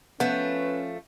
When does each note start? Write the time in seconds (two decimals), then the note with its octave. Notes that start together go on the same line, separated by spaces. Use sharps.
0.20 F3 A3 B3 C#4 B4